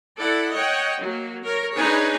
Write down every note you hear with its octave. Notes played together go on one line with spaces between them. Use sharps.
E4 A4 D5 F#5
C#5 D#5 F#5 G5
F#3 A#3
A#4 C#5
D4 D#4 G#4 B4 C#5 G#5